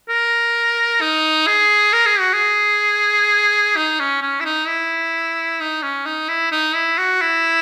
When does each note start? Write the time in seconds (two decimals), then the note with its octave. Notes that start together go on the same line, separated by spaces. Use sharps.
0.09 A#4
1.01 D#4
1.47 G#4
1.93 A#4
2.06 G#4
2.20 F#4
2.34 G#4
3.77 D#4
4.00 C#4
4.22 C#4
4.40 E4
4.45 D#4
4.68 E4
5.61 D#4
5.83 C#4
6.06 D#4
6.29 E4
6.52 D#4
6.75 E4
6.98 F#4
7.21 E4